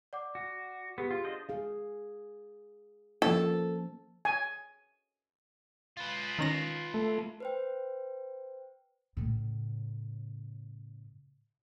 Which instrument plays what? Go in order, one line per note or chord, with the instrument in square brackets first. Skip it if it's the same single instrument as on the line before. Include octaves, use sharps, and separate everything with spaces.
[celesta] D5 F#5 D6
[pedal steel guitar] F#4
[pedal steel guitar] B3 [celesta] G4 G#4
[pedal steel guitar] F4
D4 C5 D#5
[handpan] G#4 F5
[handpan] F3 A#3 C#4 [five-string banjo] A4
[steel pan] G#5
[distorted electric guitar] F4 B4
[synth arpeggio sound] D#3 C#4 A#6
[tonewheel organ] A3
[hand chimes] B4 C5 G5
[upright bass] A2 C#3